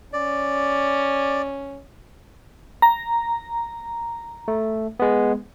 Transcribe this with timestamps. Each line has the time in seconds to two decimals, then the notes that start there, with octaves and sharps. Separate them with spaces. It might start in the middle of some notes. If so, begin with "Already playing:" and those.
0.13 C#4 D5
2.82 A#5
4.48 A3
5.00 G#3 B3